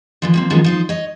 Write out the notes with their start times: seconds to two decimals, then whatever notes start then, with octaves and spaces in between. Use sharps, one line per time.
0.22 D3 E3 F3
0.34 F3 A#3 C4
0.50 D#3 F3 F#3 G#3 B3 C#4
0.64 F3 D#4 C5
0.89 C#5 D#5